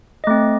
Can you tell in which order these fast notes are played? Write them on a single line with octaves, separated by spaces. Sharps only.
D#5 A3 C4